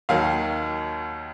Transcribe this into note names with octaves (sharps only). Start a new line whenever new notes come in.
D#2 D#3 F#3 F5